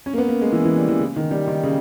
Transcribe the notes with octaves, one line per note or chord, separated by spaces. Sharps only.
C#4
A#3
B3
A#3
G#3
E3
E3
G3
E3
C#3
D#3
G3
D#3
C#3